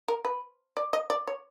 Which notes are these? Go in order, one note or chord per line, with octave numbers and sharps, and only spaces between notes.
A#4
B4
D5
D#5
D5
C#5